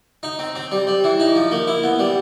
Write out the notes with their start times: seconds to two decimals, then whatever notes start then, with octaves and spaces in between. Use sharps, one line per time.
0.23 D#4
0.39 C4
0.56 C4
0.72 G3
0.87 G3
1.04 E3
1.20 D#4
1.36 F3
1.51 A#3
1.67 E4
1.83 B3
1.99 G3